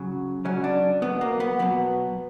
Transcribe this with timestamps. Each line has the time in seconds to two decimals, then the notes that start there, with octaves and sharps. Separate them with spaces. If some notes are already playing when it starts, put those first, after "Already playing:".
Already playing: C#3 F#3
0.45 C#3 F#3 C#4
0.64 D4
1.02 B2 F#3 B3
1.21 A#3
1.40 B3
1.59 B2 F#3 B3